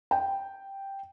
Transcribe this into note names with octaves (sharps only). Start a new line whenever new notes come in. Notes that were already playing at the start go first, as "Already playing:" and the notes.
G5